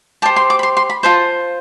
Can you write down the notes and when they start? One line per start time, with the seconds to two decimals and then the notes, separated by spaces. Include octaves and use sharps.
0.22 G4 C5 A5
0.36 C6
0.50 D6
0.59 B5
0.63 C6
0.77 C6
0.90 B5
1.03 F4 C5 A5